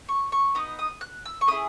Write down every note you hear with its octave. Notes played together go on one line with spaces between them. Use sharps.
C#6
C#6
B3 D#4 D#6
D#6
F#6
E6
C#6
A#3 C#4 E4 G#4 D#6